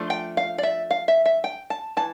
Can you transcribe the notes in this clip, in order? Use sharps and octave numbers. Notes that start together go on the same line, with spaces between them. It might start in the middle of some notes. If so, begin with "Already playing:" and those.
Already playing: F3 A3 D4
G5
F5
D5
E5
F5
E5
E5
G5
A5
E3 A5